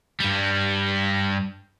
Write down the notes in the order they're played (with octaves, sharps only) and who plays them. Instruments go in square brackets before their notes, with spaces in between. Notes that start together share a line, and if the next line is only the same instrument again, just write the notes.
[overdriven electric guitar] G2 G3